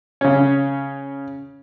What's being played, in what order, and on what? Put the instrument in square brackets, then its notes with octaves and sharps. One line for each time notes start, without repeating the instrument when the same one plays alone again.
[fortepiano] C#3 C#4